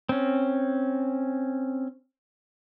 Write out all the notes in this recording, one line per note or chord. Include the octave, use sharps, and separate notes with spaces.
C4 C#4